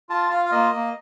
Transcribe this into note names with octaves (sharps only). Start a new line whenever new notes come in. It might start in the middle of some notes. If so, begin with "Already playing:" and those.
F4 A5
F4 F5
F5
A#3 D#5
A#3